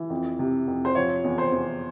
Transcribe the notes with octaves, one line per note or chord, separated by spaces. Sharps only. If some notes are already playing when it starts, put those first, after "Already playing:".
Already playing: E3
F2
C3
F2
C5
F3 C#5
E2
C5
E2